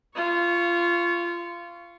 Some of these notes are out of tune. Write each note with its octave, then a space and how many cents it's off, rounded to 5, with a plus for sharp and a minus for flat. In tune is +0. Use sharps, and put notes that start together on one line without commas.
F4 -20 C#6 +0